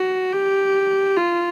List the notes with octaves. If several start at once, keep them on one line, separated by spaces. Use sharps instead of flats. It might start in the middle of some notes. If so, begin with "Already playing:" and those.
Already playing: F#4
G4
F4